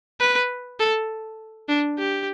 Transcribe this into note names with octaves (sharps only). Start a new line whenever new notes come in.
B4
A4
D4
G4